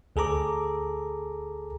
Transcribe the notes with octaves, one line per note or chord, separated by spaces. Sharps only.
D2 G#4 A4 A#5 D6